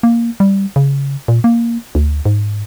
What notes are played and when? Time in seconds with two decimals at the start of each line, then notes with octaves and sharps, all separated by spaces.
0.03 A#3
0.40 G3
0.76 C#3
1.28 A#2
1.44 A#3
1.95 D2
2.25 G#2